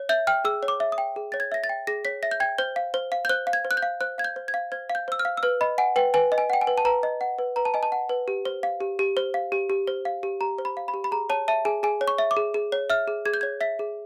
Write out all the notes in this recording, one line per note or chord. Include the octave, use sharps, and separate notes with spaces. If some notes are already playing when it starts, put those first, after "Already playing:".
Already playing: C#5
E5 G6
G5 F6
G#4 E6
C#5
D6
E5
D#6
G5
G#4
C#5 A6
G#6
E5 A#6
A6
G5
G#4 A#6
C#5 B6
E5 A#6
G6
G5 G#6
C5 G6
F5
C5
F5
G6
C5 F#6
F5
G#6
C5
F#6
G6
F5
C5 F#6
F5 G#6
G6
C5
G#6
F5
C5 G#6
F5
G6
C5 E6
F6
F5
E6
B4 F6
D#5 B5
F#5 G#5
B4 G5
B4 G#5
D#5
G#5
F#5 G5
G#5
B4
A5
B4 A#5
D#5
F#5
B4
B4 A#5
A5
D#5 G#5
A5
F#5
B4
G4
C5
F5
G4
G4
C5
F5
G4
G4
C5
F5
G4
G4 A#5
C5
B5
F5
B5
G4
B5
G#4 A#5
C#5 A5
E5 A5
G#4 G#5
G#4 G#5
C#5
C#6
E5
D6
G#4
G#4
C#5
E5 F6
G#4
G#4 G#6
G6
C#5 G#6
E5 B6
G#4